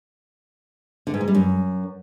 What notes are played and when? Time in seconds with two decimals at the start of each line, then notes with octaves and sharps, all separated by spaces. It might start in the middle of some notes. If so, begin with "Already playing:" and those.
1.07 D3
1.14 G#2
1.21 G#3
1.28 G3
1.35 F#2